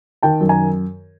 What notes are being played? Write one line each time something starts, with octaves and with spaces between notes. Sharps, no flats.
D#3 G5 A5
F#2
G#5 A#5